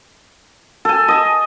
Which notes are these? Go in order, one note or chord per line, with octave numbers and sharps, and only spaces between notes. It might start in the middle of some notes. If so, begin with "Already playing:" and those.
A4 G#5
D#5 G#5